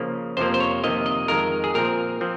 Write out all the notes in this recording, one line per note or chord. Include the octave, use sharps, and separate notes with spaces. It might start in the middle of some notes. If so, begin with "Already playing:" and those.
Already playing: C#3 F3 A#3
F2 C3 F3 A#3 C5
C5
C#5
F2 C3 D#3 A#3 D#5
D#5
F2 D#3 G#3 A#4
G#4
A#2 F3 C4 A#4
F3 C4